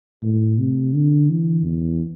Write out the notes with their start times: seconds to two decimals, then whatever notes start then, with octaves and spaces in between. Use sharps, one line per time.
0.23 A2
0.58 C3
0.94 D3
1.30 E3
1.65 E2